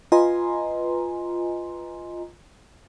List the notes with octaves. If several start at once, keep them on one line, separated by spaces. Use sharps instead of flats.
F4 B4 D#5 G#5 A#5 C6